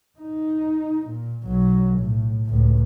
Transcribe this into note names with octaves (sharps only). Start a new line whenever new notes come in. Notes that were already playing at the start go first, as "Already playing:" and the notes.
D#4
A#2
B1 F#3
A2
C#2 A2